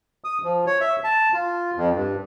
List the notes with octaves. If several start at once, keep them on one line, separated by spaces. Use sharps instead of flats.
D#6
F3
C#5
E5
A5
F4
F2
G2